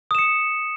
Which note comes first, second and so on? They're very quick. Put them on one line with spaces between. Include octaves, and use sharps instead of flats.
D#6 E7 C#7